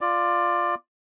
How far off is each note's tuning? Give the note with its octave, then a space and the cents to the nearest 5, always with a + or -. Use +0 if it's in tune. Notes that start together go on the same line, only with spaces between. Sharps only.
F4 +0 D5 +15